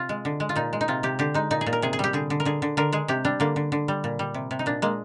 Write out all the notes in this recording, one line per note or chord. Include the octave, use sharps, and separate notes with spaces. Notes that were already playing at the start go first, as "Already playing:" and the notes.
Already playing: C3 F4
G#3
D3
G#3
F4
A#2 D#4
G#3
D#4
C3 F4
C3 G4
D3 G4
G#3 D#4
A#2 D#4
G#4
A#2
A#4
C3 G#4
G#4
G3 G4
D3 G#4
D3
A#4
D3 G#4
D3
D3 A#4
G#3 G#4
C3 G4
G3 D4
D3 A#3
D3
D3
G3
A#2
G3
C3
C3
D#4
A#2 D4
G#3 A#3